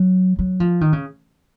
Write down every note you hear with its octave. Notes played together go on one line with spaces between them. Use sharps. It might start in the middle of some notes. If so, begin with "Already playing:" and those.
Already playing: F#3
F#3
F3
D#3
C#3